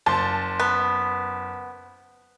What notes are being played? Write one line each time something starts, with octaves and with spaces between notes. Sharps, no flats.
F#1 A5 C6
B3